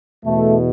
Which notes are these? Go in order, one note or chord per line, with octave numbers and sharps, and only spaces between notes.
E2 B2 A3